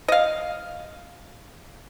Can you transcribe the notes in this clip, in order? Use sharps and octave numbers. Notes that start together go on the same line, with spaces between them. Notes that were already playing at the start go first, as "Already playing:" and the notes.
D#5 F5